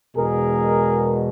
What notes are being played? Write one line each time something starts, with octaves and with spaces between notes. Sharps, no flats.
E2 B2 G#3 G#4 A#4